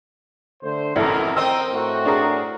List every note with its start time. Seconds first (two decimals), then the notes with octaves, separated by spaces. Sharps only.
0.63 D3 A3 C5
0.96 A1 F2 B2 E4 A4 A#4
1.37 C4 A#4 D#5 G5 E6
1.72 A2 A3 F#4
2.05 D4 G#4 A#4